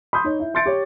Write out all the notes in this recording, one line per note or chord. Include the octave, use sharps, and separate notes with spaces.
B5 C6 D#6 G6
D#4 C#5
E4
E5 C6 G6 A6 C#7 D7
G4 C#5